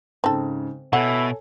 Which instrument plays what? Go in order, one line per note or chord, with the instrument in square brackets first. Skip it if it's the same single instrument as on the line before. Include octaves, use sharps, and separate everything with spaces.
[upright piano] G#2 C#3 [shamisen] C4 A4
[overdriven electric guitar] B2 [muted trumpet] E4 [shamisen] F#4 [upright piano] A4 C#5 G#5